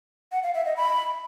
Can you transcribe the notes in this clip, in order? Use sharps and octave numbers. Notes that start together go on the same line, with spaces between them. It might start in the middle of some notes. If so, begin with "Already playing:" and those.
F#5
F5
E5
D#5
B5